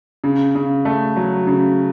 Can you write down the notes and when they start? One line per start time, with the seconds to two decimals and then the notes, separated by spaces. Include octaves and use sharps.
0.24 C#3
0.55 C#3
0.85 A3
1.16 F#3
1.47 C#3